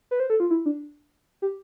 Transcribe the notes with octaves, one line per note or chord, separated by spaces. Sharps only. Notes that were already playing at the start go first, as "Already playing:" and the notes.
B4
C5
A4
F4
E4
D4
G4